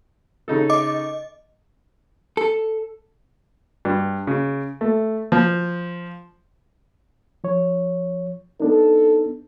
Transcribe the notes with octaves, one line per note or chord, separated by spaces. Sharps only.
C#3 D#4 A4
D#5 D6
A4
G2
C#3
A3
F3
F3 C#5
B3 D4 D#4 A4